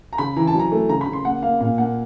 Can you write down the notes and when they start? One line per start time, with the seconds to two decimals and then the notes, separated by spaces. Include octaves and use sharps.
0.13 A#5
0.18 C#3 B5
0.36 E3 A#5
0.47 A5
0.54 F#3
0.59 A#5
0.72 A3
0.89 C#3 A#5
1.01 B5
1.07 C#3
1.13 C6
1.25 A#3 F#5
1.42 A#3 F5
1.61 A#2 F5
1.78 A#3 F#5